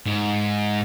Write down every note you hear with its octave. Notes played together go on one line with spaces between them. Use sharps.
G#2